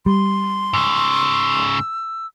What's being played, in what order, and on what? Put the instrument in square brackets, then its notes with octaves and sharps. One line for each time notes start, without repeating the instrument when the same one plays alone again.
[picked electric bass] G3 [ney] C6
[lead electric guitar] G#2 C#3 [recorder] E6